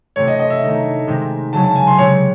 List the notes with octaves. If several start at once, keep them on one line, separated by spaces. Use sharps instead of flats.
C3 E3 A3 C4 C#5
D#5
D#5
E5
D#3 A3 D#4
C3 D#3 G#3 C4 D#4
C#3 F#3 C#4 A5
A5
G#5
C6
C3 D#3 G#3 C4 C#5